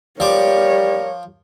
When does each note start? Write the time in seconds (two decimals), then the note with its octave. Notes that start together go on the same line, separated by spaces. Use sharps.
0.20 F3 G3 A#4 C#5 D6